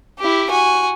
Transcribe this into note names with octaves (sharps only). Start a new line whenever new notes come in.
E4 G4
F#4 G#5